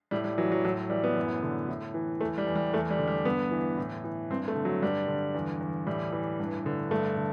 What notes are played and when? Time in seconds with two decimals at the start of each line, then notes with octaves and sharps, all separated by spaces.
0.11 A2 G3
0.24 G3
0.38 E3 F#3
0.52 F#3
0.64 A2 F#3
0.90 E3 G3
1.04 B3
1.16 F#2
1.43 D3
1.69 A2
1.94 E3
2.21 E2 A3
2.38 G3
2.47 E2
2.55 G3
2.74 E2 A3
2.91 G3
2.99 D3
3.07 G3
3.25 G2 B3
3.51 E3
3.77 A2
4.04 E3
4.30 G2 C4
4.48 A3
4.56 D3
4.65 F#3
4.82 G2 G3
5.08 D3
5.35 E2
5.61 E2
5.86 A2 G3
6.12 E3
6.40 G2
6.66 D3
6.91 G2 A3
7.17 D3